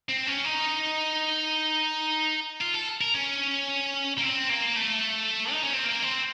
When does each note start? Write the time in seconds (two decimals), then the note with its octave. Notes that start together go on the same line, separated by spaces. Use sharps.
0.09 C4
0.27 C#4
0.45 D#4
2.61 F4
2.74 A4
3.01 A#4
3.14 C#4
4.18 A#3
4.23 C4
4.50 A#3
4.76 A3
5.52 D#4
5.63 C#4
5.73 C4
5.84 A#3
6.02 C4